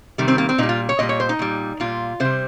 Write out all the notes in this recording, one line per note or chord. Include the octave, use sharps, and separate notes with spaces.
C3 D#3 G3
C4
A#3
C4
A#2 G3 D#4
F4
C#5
A#2 G3 D#5
C#5
C5
D#4
A#2 G3
A#2 G3 F4
C3 G3 C5